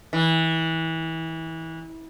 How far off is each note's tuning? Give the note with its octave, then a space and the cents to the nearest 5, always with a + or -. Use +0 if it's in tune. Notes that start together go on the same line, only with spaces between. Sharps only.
E3 -25